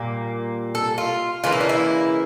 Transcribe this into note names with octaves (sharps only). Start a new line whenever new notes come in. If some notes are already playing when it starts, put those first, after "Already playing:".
Already playing: A#2 G3 A#3
A4
F4
C#3 E3 A#3 F4
E4
D4
E4